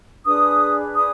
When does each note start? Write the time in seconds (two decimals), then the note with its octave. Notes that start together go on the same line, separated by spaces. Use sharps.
0.25 D4 G#4 B4 D#6
0.94 D#6